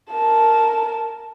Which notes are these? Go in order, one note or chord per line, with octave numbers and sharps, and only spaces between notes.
A#4 A5